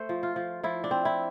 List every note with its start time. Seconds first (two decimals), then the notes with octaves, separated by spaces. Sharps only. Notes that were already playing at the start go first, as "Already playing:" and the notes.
Already playing: A3 C5
0.09 F3
0.23 F4
0.36 F3
0.63 F3 E4
0.84 D4
0.91 C4
1.05 E4